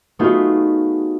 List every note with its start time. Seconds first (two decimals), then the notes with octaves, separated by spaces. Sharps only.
0.19 A3 B3 D#4 F4 F#4 G#4